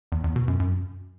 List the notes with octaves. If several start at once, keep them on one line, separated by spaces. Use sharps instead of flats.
E2
E2
B2
F#2
F#2